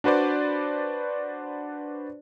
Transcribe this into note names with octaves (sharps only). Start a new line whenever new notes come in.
D4 F#4 B4 C5 D5